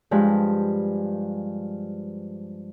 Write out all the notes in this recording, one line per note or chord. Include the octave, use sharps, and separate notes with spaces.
G2 F3 G#3 B4